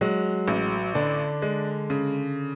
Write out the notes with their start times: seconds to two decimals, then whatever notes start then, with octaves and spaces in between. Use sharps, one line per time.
0.01 F#3 G#3
0.48 A1
0.95 D3 D4
1.42 G#3
1.90 C#3